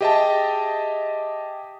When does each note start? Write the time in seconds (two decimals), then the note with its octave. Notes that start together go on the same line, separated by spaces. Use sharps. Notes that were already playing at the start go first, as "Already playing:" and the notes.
0.01 G4 G#4 D#5 E5 G5 A5